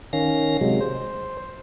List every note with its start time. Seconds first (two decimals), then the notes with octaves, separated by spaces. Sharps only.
0.13 D#3 C#4 F5 A#6
0.61 C3 F#3 G#3
0.81 C5